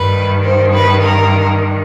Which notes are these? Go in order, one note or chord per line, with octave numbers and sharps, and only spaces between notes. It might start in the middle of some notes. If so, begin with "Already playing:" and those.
Already playing: G2 D#3 B4
C5
B4
A#4